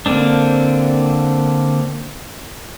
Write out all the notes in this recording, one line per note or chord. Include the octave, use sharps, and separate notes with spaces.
D3 A#3 C4 D4